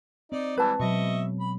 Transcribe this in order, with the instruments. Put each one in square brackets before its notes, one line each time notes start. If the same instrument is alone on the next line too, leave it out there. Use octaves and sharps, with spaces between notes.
[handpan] C4 [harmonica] D#4 D5
[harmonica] E3 G3 [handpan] G#3 [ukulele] B4 A5
[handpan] B2 F#3 [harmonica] D#5 E5 C#6
[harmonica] B5